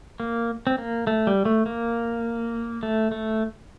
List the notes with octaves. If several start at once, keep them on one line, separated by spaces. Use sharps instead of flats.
A#3
C4
A#3
A3
G3
A3
A#3
A3
A3